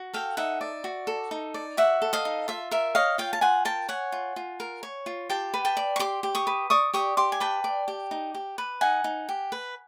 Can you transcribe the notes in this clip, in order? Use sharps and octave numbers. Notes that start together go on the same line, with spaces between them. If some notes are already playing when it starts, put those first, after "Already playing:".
Already playing: F#4
A4 F5 G5
D#4 E5 F#5
D5
F#4
A4
D#4
D5
F#4 E5 F#5
A4
D#5 F5
D#4
F4 E5
A#4 E5
C#5 D#5 F5
F4 F5 G5
A5
F4 F#5 G#5
A#4 G5 A5
C#5 F#5 G#5
F4
F4
A#4
C#5
F4
G4 G5 A5
B4
G5 A5
D5
C#6
G4 C6 D6
G4
C#6 D#6
B4
D5 C#6 D#6
G4 C#6 D#6
G4 C6 D6
G#5
B4 G5 A5
D5
G4
D#4
G4
B4
D#4 F#5 G#5
D#4
G4
B4